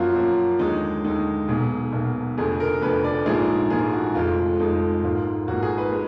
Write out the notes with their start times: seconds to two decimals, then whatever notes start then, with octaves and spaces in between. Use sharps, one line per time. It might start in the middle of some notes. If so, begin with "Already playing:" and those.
Already playing: F#2 F3 A#3 F4 F#4
0.15 F#2 F3 A#3
0.59 D#2 D3 G#3 D#4
1.04 D#2 D3 G#3 D#4
1.48 B1 B2 A#3 G#4
1.92 B1 B2 A#3
2.38 F1 F2 D3 G#4
2.60 A#4
2.82 F1 F2 D3 B4
3.04 D5
3.26 A#1 G#2 F3 A#3 G#4
3.70 A#1 G#2 F3 A#3 G#4
3.93 F#4
4.15 F1 F2 F3 G#3 F4
4.59 F1 F2 F3 G#3 D#4
5.03 G#1 G#2 F3 A#3 F4
5.48 G#1 G#2 F3 A#3 F#4
5.63 G#4
5.78 B4
5.92 G#3